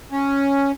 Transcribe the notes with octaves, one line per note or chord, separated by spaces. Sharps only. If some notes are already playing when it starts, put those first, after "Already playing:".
C#4